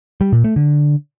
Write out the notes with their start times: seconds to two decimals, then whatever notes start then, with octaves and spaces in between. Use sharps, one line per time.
0.21 G3
0.33 A#2
0.44 A3
0.56 D3